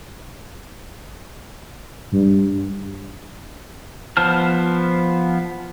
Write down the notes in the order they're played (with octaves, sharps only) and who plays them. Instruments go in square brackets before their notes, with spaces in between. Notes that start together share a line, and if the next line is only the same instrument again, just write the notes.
[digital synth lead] G2
[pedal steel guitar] F3 B3 C5 A5 F6